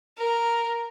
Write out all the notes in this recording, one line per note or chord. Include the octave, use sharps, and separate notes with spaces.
A#4